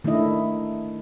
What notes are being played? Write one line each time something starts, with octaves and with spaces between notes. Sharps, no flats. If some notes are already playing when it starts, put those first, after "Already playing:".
D#3 A3 D4 E4 D#5